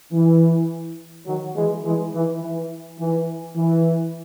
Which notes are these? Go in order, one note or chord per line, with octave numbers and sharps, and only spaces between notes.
E3
D#3 F#3
E3 G#3
E3 G#3
E3
E3
E3
E3